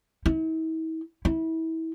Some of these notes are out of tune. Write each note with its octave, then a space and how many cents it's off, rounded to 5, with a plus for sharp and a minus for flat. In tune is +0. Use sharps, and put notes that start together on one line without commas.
E4 -45
E4 -30